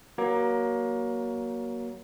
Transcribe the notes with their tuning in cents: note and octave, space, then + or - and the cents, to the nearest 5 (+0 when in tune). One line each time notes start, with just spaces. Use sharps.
F#3 +20 A#3 +25